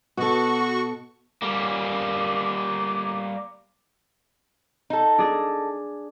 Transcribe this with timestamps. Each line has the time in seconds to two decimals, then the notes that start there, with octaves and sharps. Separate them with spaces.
0.17 B2 F#4 A4 C#6
1.42 G3 A#3
4.90 D#4 A4
5.18 D4 G#4